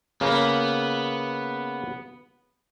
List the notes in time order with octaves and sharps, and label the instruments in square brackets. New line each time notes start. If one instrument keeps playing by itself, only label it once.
[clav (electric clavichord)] C#3 A#3 [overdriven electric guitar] B3